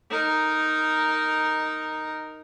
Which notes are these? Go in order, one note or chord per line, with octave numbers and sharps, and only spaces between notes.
D#4 A#4